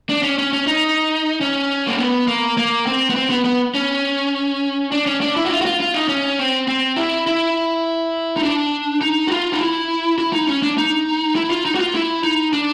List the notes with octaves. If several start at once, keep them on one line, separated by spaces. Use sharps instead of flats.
D4
C#4
C#4
C#4
D#4
C#4
A#3
B3
A#3
A#3
C4
B3
C4
B3
B3
C#4
D4
C#4
D4
E4
F#4
F4
F#4
F4
F4
D#4
C#4
C4
C4
E4
E4
D#4
D4
D#4
F#4
F4
D#4
E4
E4
D#4
C#4
D4
D#4
E4
F4
D#4
F#4
F4
E4
D#4
D4